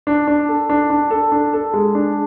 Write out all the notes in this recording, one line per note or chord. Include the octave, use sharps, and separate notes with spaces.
D4
D4
A4
D4
D4
A4
D4
A4
G#3
D4